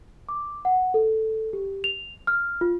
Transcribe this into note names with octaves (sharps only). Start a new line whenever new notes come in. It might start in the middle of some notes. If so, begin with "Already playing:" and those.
D6
F#5
A4
G4
F7
F6
F4